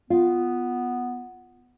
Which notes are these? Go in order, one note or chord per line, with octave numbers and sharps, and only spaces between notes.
B3 F4